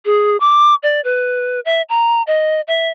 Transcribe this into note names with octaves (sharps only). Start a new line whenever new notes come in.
G#4
D6
D5
B4
E5
A#5
D#5
E5